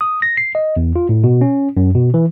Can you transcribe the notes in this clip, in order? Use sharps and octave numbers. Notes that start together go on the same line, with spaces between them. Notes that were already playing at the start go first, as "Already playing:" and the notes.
D#6
A#6
C7
D#5
E2
F4
A2
B2
C#4
F#2
B2
E3